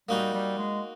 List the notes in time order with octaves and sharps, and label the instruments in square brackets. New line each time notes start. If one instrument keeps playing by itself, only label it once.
[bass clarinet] G3 [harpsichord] A#3 D#4 F#4
[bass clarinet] G3
G#3